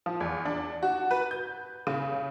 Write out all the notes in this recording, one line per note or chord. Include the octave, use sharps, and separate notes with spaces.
F3
E2
D4
F#4
B4
G6
C#3